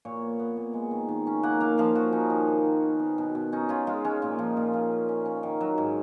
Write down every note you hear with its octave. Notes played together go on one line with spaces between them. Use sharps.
A#2 C#5
B3
B3
A#2
G#3
D#3
D#3
C#4
A#3 F#5
A#3 F5
F3 F5
F3 F#4
C#4 D#4
D#3
D#3
D#3
B3
B3
B2
B2
C#4 D#4
C#4 F4
G#3 F4
G#3 C#4
A#2 C#4
F3 D#4
A#2 F4
A#2 F4
C#4
C#4
C#4
D#3
F#3
G#2